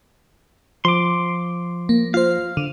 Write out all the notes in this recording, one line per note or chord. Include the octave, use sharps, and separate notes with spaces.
F3 C6 D6
A#3
F4 C5 F5
D3